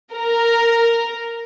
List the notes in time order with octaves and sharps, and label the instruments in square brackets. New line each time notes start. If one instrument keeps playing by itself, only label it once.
[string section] A#4